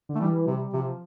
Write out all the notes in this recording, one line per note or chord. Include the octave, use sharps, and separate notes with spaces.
D3
A3
E3 G3
C3 G3
C3 F3